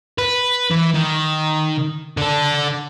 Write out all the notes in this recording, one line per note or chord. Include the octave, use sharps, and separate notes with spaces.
B4
E3
D#3
D3 A4